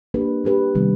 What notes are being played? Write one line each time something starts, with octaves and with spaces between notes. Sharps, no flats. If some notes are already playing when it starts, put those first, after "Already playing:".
A#3 D4 G4 B4
A#3 D4 G4 B4
C3 D#3 G3 B3